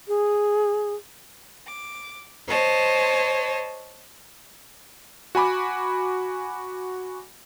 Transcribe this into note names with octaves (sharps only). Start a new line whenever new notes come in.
G#4
D6
C5 C#5 D#5 A5
F#4 G#5 B5 D6